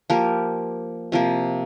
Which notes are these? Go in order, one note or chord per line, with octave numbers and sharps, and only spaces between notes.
F3 A#3 G4 A#4
C3 F3 A#3